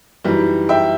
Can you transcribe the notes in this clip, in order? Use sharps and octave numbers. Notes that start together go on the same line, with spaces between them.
F#2 E3 G3 D#4
E5 G5